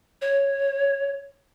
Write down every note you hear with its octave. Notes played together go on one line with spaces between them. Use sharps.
C#5